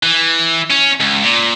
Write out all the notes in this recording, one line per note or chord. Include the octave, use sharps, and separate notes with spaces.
E3
C#4
C#2
A#2